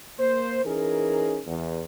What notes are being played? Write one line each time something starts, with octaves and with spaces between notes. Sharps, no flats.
A#3 C5
E3 C#4 D#4 G#4 A#4
E2